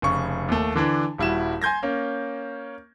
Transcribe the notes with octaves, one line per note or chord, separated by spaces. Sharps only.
F1 C#3 C#6
D#2 A3
D3 E3 D4
D#1 G3 E4 F#4 E7
G#5 C6 G6 G#6 A#6
A#3 C#4